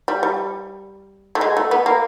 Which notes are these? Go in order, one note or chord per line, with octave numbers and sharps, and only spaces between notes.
G3
G3
A3
G#3
A3
B3
A#3